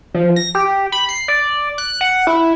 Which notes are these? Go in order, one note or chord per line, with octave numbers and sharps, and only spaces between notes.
F3
A#6
G4
B5
C7
D5
F#6
F#5
E4